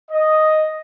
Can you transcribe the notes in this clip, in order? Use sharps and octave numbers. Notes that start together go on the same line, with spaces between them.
D#5